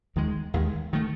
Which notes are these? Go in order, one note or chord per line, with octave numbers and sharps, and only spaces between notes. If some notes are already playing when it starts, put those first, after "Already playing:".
D#2 D#3 G#3
D#2 D#3 G#3
D#3 A3